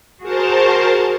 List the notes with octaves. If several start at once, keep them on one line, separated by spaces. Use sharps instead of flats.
F#4 G#4 A#4 C5 A5